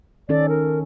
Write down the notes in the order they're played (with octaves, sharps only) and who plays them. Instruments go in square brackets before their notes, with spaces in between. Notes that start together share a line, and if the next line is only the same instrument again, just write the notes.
[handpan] D#3 C#4 A4 [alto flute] D5
[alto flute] A#4